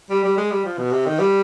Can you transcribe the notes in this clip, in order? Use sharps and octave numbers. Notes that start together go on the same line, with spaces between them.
G3
G3
G#3
G3
F3
B2
C3
D#3
G3